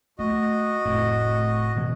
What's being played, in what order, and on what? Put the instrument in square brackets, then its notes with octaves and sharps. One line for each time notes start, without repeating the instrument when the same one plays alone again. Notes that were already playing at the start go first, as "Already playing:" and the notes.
[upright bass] A3 [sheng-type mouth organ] F#4 D#5
[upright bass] F1 [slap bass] A2
[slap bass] B2 E3 G#3